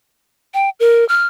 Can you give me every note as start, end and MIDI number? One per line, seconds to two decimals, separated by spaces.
0.54 0.70 79
0.80 1.07 70
1.09 1.27 89